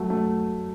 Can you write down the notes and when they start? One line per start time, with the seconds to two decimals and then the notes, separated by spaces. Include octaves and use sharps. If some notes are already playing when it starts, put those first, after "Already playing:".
Already playing: F#3 A3
0.10 A3